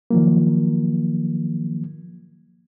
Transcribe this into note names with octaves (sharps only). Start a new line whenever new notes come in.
D#3 F3 F#3 A#3